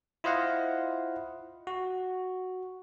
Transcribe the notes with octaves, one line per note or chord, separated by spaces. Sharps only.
E4 F4 C5 D#5 F5 F#5
F#4